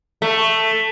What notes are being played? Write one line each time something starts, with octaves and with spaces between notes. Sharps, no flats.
A3